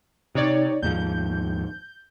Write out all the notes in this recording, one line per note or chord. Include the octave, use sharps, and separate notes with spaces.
C3 D#4 C#5 D5
D#2 G#2 F3 G6